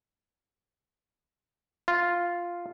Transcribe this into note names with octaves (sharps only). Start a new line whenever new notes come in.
F4